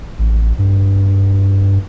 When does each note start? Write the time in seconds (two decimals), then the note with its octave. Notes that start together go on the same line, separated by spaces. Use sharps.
0.19 A1
0.58 G2